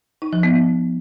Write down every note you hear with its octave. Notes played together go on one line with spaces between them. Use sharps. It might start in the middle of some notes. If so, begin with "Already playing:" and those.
D#4
F3
B3